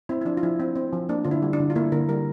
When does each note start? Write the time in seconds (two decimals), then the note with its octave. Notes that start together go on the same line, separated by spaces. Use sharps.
0.09 C4 E4
0.21 E4
0.25 F3 D4
0.37 F4
0.43 F3 E4
0.60 C4
0.76 C4
0.93 F3
1.09 A#3 D4
1.25 D3 F4
1.31 E4
1.42 G3
1.53 D4
1.60 D3
1.70 F4
1.76 A#3 E4
1.92 D3 A#4
2.09 G3 A#4